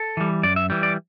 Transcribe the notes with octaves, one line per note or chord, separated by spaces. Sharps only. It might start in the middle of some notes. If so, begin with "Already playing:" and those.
Already playing: A4
E3 G3
F#2 D5
E5
E3 G3
D5